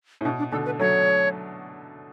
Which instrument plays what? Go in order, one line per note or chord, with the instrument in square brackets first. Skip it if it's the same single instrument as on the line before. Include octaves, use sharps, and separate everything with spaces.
[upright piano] A2
[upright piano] B2 [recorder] D4
[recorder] D4
[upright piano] B2 D3 [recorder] A4
[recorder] B4
[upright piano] F#3 A3 [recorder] C#5